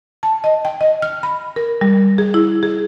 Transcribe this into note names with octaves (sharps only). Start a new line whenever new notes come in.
A5
D#5
G5
D#5
F6
B5
A#4
G3
G#4
E4
G#4